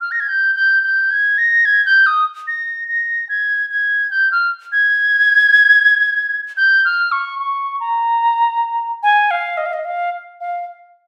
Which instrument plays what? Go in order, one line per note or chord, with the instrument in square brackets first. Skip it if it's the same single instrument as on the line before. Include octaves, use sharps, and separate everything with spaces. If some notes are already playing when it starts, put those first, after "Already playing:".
[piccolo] F6
A#6
G#6
G6
G6
G6
G#6
A#6
G#6
G6
D#6
A#6
A#6
G#6
G#6
G6
F6
G#6
G6
F6
C#6
C#6
A#5
G#5
F5
D#5
F5
D#5
F5
F5